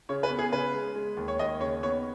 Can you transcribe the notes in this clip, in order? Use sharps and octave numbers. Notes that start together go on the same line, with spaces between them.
C#3 C#5
B4
B3
G#4
C#3 B4
G#3
G#3
D#2
C#5
D#2 D#5
C#3 C#5
B3 C#5